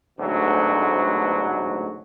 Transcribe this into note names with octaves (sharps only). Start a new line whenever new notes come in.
A1 D2 G#2 B2 D3 F#3